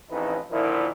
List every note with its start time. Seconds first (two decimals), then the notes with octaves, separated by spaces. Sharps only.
0.10 A1 F2 C#3 E3 D#4 B4
0.51 A#2 D3 D#3 F3 E4